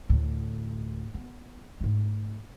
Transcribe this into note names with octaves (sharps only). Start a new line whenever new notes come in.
D2 A2
B3
G#2 A3